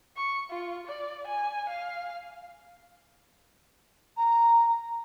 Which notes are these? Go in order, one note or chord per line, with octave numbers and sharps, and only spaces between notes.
C#6
F4
D5
G#5
F5
A#5